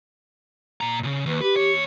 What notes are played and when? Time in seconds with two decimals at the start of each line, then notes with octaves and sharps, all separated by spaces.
0.81 A#2 A#5
1.03 A#2 C#3
1.26 D#2 B4
1.42 G4 B4
1.56 D#2 C#5